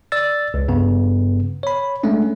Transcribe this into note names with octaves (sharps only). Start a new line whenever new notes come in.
D5 E6 A6
C#2
G2 C#3 B3
C#5 B5
G#3 A3 C#4 D4